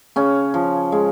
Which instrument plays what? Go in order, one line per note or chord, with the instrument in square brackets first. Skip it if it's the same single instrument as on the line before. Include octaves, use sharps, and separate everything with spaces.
[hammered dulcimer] C#3 C#4
F3
G#3